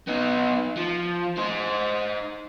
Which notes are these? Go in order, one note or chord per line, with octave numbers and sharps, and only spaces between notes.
B3 D#4
F3
D#4 C5